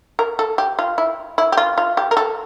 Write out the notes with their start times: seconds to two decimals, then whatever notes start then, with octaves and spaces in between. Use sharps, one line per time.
0.19 A#4
0.39 A4
0.58 G4
0.79 F4
0.98 E4
1.38 E4
1.52 G4
1.57 F4
1.78 F4
1.97 G4
2.11 A#4
2.17 A4